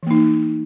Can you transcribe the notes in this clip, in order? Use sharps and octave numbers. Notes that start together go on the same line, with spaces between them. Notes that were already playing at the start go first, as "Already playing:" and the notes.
E3 A#3 D#4